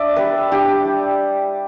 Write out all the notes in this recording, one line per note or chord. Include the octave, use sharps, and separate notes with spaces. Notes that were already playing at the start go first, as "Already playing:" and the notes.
Already playing: D4 D5 E5
G3 B4
D4 G4
G3